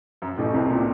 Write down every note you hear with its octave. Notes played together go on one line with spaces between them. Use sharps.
F#2
A1 A2
C2 C3
A#2